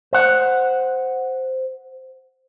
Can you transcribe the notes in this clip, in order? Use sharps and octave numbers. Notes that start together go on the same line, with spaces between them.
C5 F#5